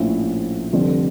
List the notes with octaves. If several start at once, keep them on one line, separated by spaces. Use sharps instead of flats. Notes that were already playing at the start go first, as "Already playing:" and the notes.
Already playing: A#1 A2 F3 C#4 E4
F1 F2 D3 G3